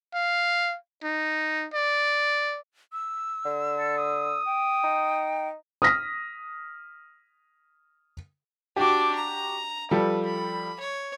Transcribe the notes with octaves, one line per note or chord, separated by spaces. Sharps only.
F5
D#4
D5
E6
D3
A4
D#6
G5
D#4
D#6 F6 A#6 B6
D4 F#4 G4 D6
A#5
F3 G3 A4 B4
B5
C#5